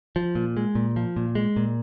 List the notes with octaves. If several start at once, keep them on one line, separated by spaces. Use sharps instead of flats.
F3
A#2
G#3
A#2
F3
A#2
G#3
A#2